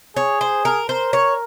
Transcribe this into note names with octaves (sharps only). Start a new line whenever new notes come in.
G#4 C#5
C5
A#4
A#4 C5
C#5